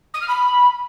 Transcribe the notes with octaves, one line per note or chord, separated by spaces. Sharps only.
D#6
F6
B5